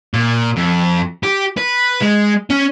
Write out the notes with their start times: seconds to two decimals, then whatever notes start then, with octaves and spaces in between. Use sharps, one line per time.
0.14 A#2
0.56 F2
1.23 G4
1.57 B4
2.01 G#3
2.50 C#4